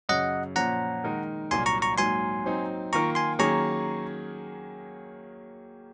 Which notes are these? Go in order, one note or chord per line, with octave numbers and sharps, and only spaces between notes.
F#2 C#3 F#3 D#5 F#5
A#2 F3 A#3 C#4 F#5 A#5
D#3 G#3 D#4 A#4
C2 A#2 F#3 A#3 G#5 C6
A#5 C#6
A#5 C#6
G#2 F#3 A#3 G#5 C6
F#3 C4 D#4
D#3 A#3 F4 A#4 A#5 C#6
G#5 C6
D#3 F#3 A#3 C#4 G#4 A#5 C#6